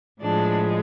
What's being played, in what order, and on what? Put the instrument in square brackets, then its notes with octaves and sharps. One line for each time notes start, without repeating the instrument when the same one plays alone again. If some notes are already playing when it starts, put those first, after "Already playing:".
[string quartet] A2 F3 G#3 D4